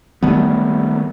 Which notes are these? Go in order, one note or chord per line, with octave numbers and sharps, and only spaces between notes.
D#3 G3 A3 B3